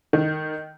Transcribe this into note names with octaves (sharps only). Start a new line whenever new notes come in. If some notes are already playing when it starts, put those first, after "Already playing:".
D#3